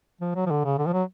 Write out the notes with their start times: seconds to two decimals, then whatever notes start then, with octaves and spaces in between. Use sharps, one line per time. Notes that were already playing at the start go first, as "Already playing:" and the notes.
0.21 F3
0.35 F#3
0.46 F3
0.50 D3
0.65 C#3
0.78 D3
0.86 F3
0.93 F#3